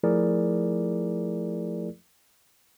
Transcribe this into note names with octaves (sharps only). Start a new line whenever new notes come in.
F3 A3 E4 G#4 A#4 D5